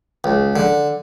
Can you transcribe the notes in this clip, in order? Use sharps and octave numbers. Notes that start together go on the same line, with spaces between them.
C#2
D3